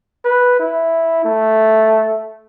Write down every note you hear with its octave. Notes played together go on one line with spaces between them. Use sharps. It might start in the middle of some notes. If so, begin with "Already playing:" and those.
B4
E4
A3